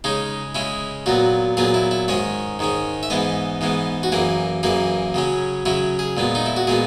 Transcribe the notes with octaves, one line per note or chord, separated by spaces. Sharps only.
C#3 G#3 C#4 D#4
C#3 G#3 C#4 E4
A#2 F#3 B3 F#4
A#2 F#3 B3 G#4
E4
E4
G#2 D#3 G#3 C#4 C#5
G#2 D#3 G#3 C#4
E5
G#2 E3 G#3 B3 D#5
G#2 E3 G#3 B3
F#4
F#2 E3 A#3 G#4
F#2 E3 A#3 G#4
C#3 F#3 C#4
C#3 F#3 C#4 E4
G#4
A#2 G#3 B3
D#4
E4
F#4
A#2 G#3 B3 G#4